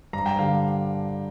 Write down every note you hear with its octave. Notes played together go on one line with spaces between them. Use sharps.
G2 A#5
G5
D3 G3 F5